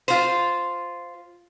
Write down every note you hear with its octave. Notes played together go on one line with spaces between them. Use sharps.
F4 C5